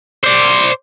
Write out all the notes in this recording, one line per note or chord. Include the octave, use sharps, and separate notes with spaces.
C5 D5